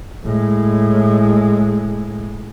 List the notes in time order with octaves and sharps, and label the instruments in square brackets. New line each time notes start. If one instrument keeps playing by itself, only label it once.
[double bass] A2 G#3